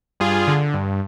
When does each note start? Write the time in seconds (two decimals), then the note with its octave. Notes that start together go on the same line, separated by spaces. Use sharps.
0.20 G2 F4 G#4
0.47 D3
0.74 G2